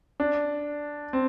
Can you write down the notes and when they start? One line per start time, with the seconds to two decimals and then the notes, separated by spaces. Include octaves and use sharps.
0.20 D4
1.13 C4